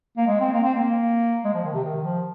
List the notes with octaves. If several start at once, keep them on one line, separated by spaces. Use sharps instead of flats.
A#3
G#3
C4
A#3
C4
A#3
G#3
F3
D#3
C3
D#3
F3